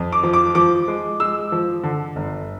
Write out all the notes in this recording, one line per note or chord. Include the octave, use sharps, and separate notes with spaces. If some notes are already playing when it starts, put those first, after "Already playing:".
Already playing: F2
D6
F3
D6
F3 D6
G#3
G#3 E6
F3
D3
G1